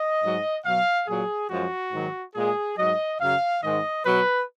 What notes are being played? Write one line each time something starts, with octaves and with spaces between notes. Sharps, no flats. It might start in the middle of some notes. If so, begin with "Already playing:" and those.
Already playing: D#5
G#2 F#3
B2 F#3 F5
A#2 F#3 G#4
F#2 F3 G#3 F#4
G#2 D#3 F#3
A#2 G#3 G#4
G#2 F#3 D#5
F#2 C#3 F#3 F5
G#2 D#3 G#3 D#5
B2 F#3 B4